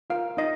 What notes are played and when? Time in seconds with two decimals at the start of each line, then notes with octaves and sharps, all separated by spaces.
0.10 F4 A#4 F5
0.37 D#4 D#5